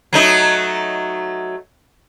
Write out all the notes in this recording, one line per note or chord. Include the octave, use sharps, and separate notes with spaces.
F#3 A3 D#4